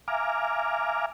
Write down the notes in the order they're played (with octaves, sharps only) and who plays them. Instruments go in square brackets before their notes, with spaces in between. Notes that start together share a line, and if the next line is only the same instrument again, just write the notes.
[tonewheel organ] E5 F5 G#5 A#5 D6 F6